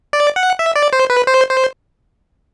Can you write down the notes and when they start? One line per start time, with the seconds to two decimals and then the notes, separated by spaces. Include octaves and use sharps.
0.13 D5
0.36 F#5
0.59 E5
0.76 D5
0.93 C5
1.10 B4
1.27 C5
1.50 C5